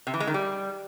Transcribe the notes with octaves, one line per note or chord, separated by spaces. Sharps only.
C3
E3
G#3
D#3
G3